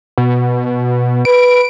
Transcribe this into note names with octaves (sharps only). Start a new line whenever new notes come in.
B2
B4 D7